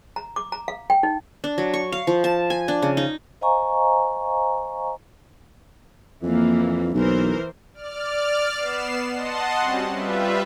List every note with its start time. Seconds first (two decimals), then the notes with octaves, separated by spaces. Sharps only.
0.16 A#5
0.36 D6
0.52 A#5
0.68 F5
0.90 G5
1.03 D#4
1.44 D4
1.58 F#3
1.74 C#6
1.92 F5
2.07 F3
2.24 A5
2.50 G#5
2.68 D4
2.82 C#3
2.97 D#4
3.41 C5 D#5 F5 G#5 A#5 C#6
6.22 F2 E3 A#3
6.94 B1 E3 A#4 C5
7.74 D5 F6
8.55 B3 C7 E7
9.11 D#5 F#5 A5 C6
9.58 G3 C4 C#4 F#4
9.92 G3 F4 B4 E5